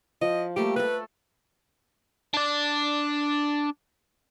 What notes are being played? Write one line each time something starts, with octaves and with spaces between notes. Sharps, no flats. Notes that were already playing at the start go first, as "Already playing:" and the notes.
F3 D#5
G3 A3 A#3 G4
A3 A4 B4
D4 D5